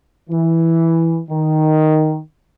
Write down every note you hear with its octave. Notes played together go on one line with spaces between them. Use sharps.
E3
D#3